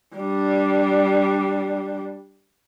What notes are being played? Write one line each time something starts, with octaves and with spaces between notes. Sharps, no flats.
G3 D4